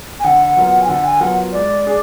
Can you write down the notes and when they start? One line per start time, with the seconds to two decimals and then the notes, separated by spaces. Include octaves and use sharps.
0.20 G#5
0.24 D3 F#5
0.56 F#3 B3 F4 A#4
0.82 G#5
0.88 D3 F#5
1.04 G#5
1.20 F#3 B3 F4 A#4 F#5
1.52 G#3 D5
1.86 D4 G#4